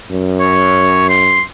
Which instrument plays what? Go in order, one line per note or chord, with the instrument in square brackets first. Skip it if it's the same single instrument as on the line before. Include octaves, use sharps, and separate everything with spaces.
[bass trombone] F#2
[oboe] C#5
C6